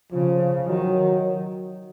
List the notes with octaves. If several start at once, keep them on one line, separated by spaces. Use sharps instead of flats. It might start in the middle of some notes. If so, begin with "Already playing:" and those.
C#3 F3
D#3 F#3